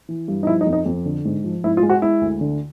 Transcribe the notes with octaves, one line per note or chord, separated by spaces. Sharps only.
E3
G2
D#4
F3 E4
D#4
F2
D#4
F2
D3
G#2
F3
G#2 E4
F4
G#3
F#4
G#3 E4
D2
D3